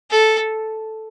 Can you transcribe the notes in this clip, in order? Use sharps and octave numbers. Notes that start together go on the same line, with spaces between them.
A4